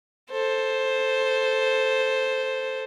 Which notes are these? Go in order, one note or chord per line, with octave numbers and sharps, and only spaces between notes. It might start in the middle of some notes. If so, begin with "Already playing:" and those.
A4 C5